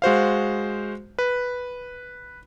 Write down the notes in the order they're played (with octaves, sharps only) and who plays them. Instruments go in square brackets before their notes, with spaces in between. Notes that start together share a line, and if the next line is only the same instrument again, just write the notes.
[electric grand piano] G#3 F#4 C5 F5
B4